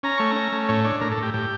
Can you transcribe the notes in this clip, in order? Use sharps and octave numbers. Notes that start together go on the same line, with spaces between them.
C#4 A#5
A3 C#6
A#5
C#4
A3
A2 C#5
D4 C#5
A2 A#4
A4
A2
G4
A2 G4